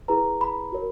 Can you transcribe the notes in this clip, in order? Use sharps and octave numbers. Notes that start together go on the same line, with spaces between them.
E4 G#4 B4 A#5
B5
F#4 A#4 C#5